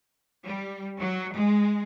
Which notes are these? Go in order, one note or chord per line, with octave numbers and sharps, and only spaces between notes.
G3
F#3
G#3